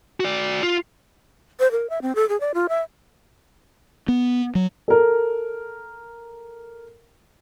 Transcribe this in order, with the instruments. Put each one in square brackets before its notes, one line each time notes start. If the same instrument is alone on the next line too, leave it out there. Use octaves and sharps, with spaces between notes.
[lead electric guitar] F#4 D5
F4
[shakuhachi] C5
A#4
E5
C4
A4
G#4
D5
F4
E5
[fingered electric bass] B3
F#3
[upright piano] A4 A#4